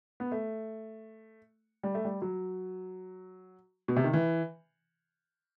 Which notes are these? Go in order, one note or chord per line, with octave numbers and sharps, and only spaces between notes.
B3
A3
G3
A3
G3
F#3
B2
C3
D#3
E3